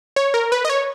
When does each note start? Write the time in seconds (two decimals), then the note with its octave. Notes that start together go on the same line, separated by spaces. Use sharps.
0.16 C#5
0.34 A#4
0.52 B4
0.65 D#5
0.70 C#5